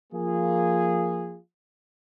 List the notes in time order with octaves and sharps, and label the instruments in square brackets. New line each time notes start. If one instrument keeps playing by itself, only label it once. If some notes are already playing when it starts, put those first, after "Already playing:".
[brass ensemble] F3 A#3 F4 G#4